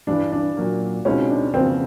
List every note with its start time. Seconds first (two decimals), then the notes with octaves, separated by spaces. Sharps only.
0.07 G2 E3 G3 D4
0.32 D4
0.57 A#2 F#3 A#3
1.05 C#2 B2 G#3 C4 C#4 D#4
1.30 D4
1.54 F#1 F2 C#3 F#3 B3 C4